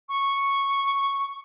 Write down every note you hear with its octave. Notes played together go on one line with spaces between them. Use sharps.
C#6